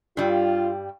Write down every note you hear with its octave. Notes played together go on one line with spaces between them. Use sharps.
G2 G3 F4